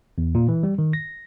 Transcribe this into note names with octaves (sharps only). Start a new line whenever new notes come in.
E2
A#2
E3
G3
D#3
A#6